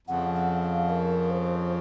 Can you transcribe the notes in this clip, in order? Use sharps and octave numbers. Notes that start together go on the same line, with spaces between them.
F2 C#3 F3 F#5
F#5
F5
A#4
C5